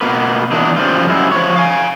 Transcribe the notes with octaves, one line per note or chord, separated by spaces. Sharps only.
B2 A#3 B4
E2 A#2 E3 D4 D#4
C#3 F3 G3 F4
F#2 G#3 E4
F3 C#5
F5 G#5